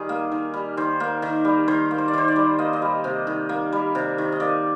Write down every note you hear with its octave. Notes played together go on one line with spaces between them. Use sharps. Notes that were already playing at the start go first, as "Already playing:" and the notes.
Already playing: D#3 G3 G#4
A#3
D#3
G3
D#3 C5
A#3
D#3
G3
D#3 C5
A#3
C5
D5
D#3 C5
D5
G3
A#3 D#5
D#5
G3
C3
D#3
A#3
G3
C3
D#3
D#5
A#3 D5